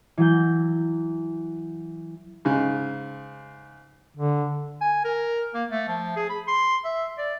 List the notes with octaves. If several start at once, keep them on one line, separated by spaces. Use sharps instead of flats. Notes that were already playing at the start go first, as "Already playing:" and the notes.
E3 F#3 G6
G#2 C#3
D3
G#5
A#4
A#3
A3
F3
G#4
B5
C6
E5
D5